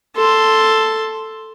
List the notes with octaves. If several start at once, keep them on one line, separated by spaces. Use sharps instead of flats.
A4 C6